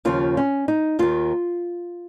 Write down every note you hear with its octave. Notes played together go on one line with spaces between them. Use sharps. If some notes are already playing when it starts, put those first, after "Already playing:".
D#2 C#3 F3 F4
C#4
D#4
D#2 D#3 F4